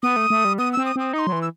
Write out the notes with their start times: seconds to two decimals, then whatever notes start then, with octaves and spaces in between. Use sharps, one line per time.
0.03 B3 D#6
0.16 A3
0.30 A3
0.45 G3
0.58 B3 D#6
0.73 C4 E6
0.85 D#6
0.96 C4 D#6
1.13 D#4 D#6
1.19 C6
1.27 F#3
1.32 E3
1.42 E6